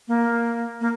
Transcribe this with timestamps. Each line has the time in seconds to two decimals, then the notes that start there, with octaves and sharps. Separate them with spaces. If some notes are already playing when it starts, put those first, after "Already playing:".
0.08 A#3
0.81 A#3